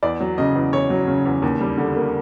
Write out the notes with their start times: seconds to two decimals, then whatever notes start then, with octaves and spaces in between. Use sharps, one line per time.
0.03 E2 D5
0.20 F#3
0.38 C#3 D#5
0.56 E2
0.73 E2 C#5
0.90 F#3
1.08 C#3
1.26 E2
1.42 D#2
1.61 G3
1.78 D3
1.96 A#3